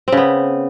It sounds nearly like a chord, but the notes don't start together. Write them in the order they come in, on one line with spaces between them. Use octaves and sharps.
C4 C#3 B3